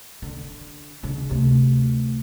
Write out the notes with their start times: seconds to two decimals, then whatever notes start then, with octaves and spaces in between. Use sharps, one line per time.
0.22 D3
1.03 C#3 D4
1.29 D2 C3